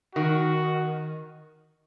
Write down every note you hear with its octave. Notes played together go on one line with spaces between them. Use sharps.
D#3 F#4